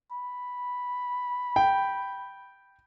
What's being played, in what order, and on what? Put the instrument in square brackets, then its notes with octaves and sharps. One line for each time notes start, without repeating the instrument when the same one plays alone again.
[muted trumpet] B5
[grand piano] G5